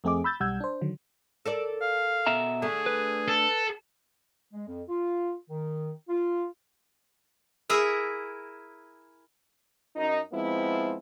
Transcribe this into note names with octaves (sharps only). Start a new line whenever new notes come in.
F2 A3 C4 G#4 D#5 D6
B5 E6 G6 A6
B1 G3 F#5 E6 G6 G#6
D4 C5
D3 D#3 F#3
A4 A#4 D5
F5
B2 E5 A#5
D3 A3 G#4
B4
A4
G#3
F2
F4
D#3
F4
E4 G#4 A#4 E5
F#2 D#4
F3 G#3 B3 C4 E4